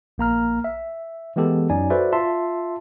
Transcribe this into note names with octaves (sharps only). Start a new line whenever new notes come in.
A#1 A#3 A#5 F6
E5
E3 G#3 B3 G4 A4
F#2 F#3 D#4 D5 G#5
F#4 A4 B4 C5 D5 E5
F4 E5 A5 C6